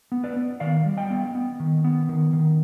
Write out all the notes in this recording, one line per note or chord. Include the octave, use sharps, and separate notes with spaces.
B3
B4 D5
B3
D#3 D5 F5
G3
D#5 G5
B3
B3
D#3
B3
D#3
D#3